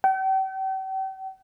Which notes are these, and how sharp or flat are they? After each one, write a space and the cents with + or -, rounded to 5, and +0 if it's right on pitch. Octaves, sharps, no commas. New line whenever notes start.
G5 -40